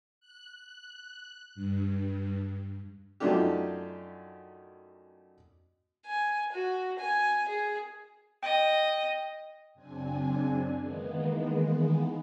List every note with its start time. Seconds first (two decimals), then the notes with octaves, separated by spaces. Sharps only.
0.20 F#6
1.55 G2
3.20 F#2 F3 A3 D4 D#4 G4
6.06 G#5
6.52 F#4
6.99 G#5
7.49 G#4
8.43 D#5 G5
9.74 F#2 C#3 C4 D4 G#5
10.77 D#3 E3 G#3 A#3 B3